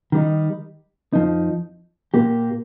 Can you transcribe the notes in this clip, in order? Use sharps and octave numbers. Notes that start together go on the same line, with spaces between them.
D#3 G3 D#4
F2 F3 D#4
A#2 A#3 G4